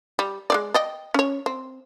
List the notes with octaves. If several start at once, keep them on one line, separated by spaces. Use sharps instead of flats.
G3
G#3 C4 D5
D5 D#5 G5
C#4 C#5
C4